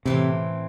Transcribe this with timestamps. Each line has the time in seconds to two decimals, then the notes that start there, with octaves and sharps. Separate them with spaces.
0.05 A2 C3 E3 C4